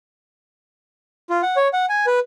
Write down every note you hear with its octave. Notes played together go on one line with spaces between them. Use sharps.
F4
F#5
C#5
F#5
G#5
B4